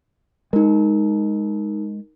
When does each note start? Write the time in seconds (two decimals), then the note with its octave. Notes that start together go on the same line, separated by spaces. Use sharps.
0.53 G#3 D#4 A#4